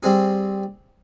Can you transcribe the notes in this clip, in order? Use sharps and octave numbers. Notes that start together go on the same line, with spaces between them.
G3 C4 G#4